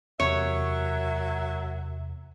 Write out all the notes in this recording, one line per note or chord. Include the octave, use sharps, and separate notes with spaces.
E2 C3 F#3 A#4 C#5 E5